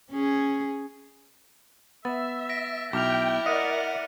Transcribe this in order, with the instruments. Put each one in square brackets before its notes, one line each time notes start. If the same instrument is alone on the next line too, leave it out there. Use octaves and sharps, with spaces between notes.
[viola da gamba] C#4 G#4
[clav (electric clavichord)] B3 [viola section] E5 [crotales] A6
[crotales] A#6 B6 D7
[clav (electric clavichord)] B1 [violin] E4 E5 [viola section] G5 [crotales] D6 F6 F7
[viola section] A#4 D5 F#5 [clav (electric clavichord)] D#5 [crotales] F6 C#7 D#7